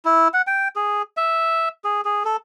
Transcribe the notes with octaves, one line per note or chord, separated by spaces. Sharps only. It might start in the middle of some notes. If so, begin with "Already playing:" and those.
E4
F#5
G5
G#4
E5
G#4
G#4
A4